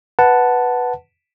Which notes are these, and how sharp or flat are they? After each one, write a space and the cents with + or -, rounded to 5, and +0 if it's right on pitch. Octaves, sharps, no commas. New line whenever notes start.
B4 +0 F#5 +0 A5 +0